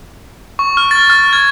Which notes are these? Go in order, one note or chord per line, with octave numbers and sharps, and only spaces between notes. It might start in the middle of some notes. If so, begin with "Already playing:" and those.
C#6
F6
A6
F6
G#6